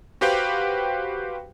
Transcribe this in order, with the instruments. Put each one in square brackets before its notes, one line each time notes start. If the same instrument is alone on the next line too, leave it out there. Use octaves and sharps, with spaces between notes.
[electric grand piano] F#4 G4 B4 C5 F5 G5